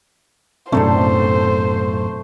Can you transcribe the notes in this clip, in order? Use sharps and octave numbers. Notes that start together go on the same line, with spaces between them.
B1 F#2 A2 A3 C4 D4 C5